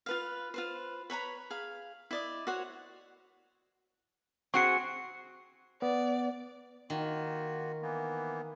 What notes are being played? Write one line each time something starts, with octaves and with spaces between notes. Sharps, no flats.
F4 B4 F5
F4 B4 C5
B4 C#5 A#5 B5
G#4 F5
E4 D5 D#5
F#4 C5 C#5 F#5
C4 F#4 G#4 C#6 C#7
B3 D5
D#3 A#3 F4 F#4
E3 A#3 B3